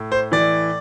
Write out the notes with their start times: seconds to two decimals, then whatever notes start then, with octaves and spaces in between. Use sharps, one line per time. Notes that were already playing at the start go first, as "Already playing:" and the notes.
Already playing: A2
0.12 C5
0.32 E3 D5